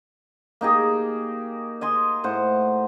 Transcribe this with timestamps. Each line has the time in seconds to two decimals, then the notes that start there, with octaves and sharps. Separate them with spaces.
0.61 A#3 D#4 G4 G#4
1.81 D#5 G#5 C6
2.24 A2 C5 F#5